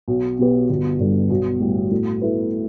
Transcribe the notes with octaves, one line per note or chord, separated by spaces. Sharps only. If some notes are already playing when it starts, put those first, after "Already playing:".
B1
B2 B3 G4 B4
G1
G2 D3 G3
B1
A2 G3
A2
A3 E4 B4